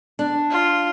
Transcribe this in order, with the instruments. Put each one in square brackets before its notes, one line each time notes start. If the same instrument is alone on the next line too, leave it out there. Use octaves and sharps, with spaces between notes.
[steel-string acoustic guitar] D4
[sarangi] F4